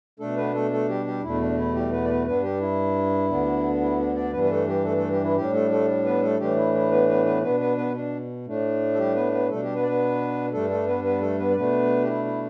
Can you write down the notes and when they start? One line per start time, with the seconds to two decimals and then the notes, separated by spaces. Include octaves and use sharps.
0.20 B2 A3 D4 A4
0.37 B3 B4
0.54 A3 A4
0.71 A3 A4
0.89 G3 G4
1.06 G3 G4
1.23 E2 B2 A3 D4 E4
1.40 D4
1.57 E4
1.74 G3 G4
1.92 B3 B4
2.04 D5
2.09 B3 B4
2.27 G2 G3 B3 D4 B4
2.43 G3 G4
2.60 E4
3.30 D2 D3 B3 D4
3.81 E4
3.98 D4
4.15 D4 D5
4.33 G2 E3 G3 B3 D4 B4
4.44 B4
4.50 A3 A4
4.67 G3 G4
4.84 A3 A4
4.97 A3 A4
5.10 G3 G4
5.23 E4
5.36 A2 G3 D4 G4
5.53 A3 A4
5.71 A3 A4
6.05 B3 B4
6.22 A3 A4
6.39 A2 E3 G3 A3 D4 G4
6.57 E4
6.74 E4
6.91 B3 B4
7.08 B3 B4
7.25 B3 B4
7.43 B2 B3 D4 B4
7.60 B3 B4
7.77 B3 B4
7.94 D4
8.46 A2 A3 D4
8.93 A4
8.98 G3 G4
9.15 B3 B4
9.32 B3 B4
9.49 B2 G3 A3 D4 A4
9.62 G3 G4
9.75 B3 B4
9.83 D5
9.88 B3 B4
10.53 G2 G3 A3 D4 A4
10.70 A3 A4
10.87 B3 B4
11.04 B3 B4
11.21 A3 A4
11.39 B3 B4
11.50 D5
11.56 B2 A3 B3 D4 B4
12.03 G4
12.08 E4
12.25 E4